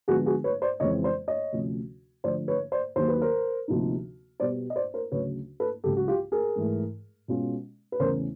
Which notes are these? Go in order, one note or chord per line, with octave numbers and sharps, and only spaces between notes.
D3 F3 G#3 B3 F#4 G#4
F#4 G#4
B4 C#5
C5 D5
F2 C#3 E3 G#3 C4 C#5 D#5
C5 D5
C#5 D#5
D2 C3 F3 A3 C#4
D3 F3 A3 C5 D5
B4 C#5
C5 D5
D#2 D#3 F#3 A#3 C5
B4
A#4 C5
D2 C3 F3 A#3 D#4
B2 G3 B3 C5 D5
D#5
C5 D5
A#4 C5
D2 C#3 F#3 B4 C#5
A4 B4
C#2 C#3 F#3 G4 A4
F#4
F4 G4
G#4 A#4
G#2 E3 A3
B2 G#3 C#4 F4
B4
E2 C#3 E3 A3 C#4 A#4 C5